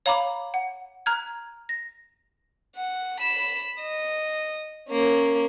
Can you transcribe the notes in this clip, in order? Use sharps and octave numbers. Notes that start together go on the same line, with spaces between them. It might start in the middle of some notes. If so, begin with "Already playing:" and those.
C#5 F5 A#5 B5 D6
F#5
A#5 F6 F#6 G#6
A#6
F#5
B5 E7
D#5
A#3 C#4